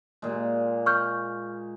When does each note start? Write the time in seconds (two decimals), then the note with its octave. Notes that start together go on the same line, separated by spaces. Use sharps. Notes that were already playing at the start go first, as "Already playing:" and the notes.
0.22 A#2 G#3
0.86 C#6 F6 G6